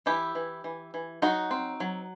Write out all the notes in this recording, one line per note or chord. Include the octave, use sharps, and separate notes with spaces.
E3 E4 G4
E3
E3
E3
F#3 D#4 F#4
C4
F#3